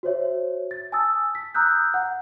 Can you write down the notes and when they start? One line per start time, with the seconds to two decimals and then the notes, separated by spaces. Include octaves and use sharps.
0.03 F#4 C5 C#5 E5
0.71 A6
0.92 G#5 A5 D#6 E6 A6
1.35 B6
1.54 A#5 D#6 E6 F#6 G6
1.94 F#5